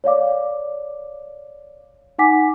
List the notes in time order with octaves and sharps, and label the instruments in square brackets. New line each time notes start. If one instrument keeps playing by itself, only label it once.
[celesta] C#5 D5 F5 D6
D#4 F#5 G#5 D6 B6